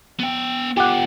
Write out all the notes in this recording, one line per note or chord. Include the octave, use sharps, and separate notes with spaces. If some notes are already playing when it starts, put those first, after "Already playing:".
B3 G5
B3 F4 G4 F#5